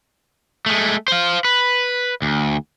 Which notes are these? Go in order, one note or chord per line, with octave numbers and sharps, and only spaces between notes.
G#3 A3
C5 F5
B4
D2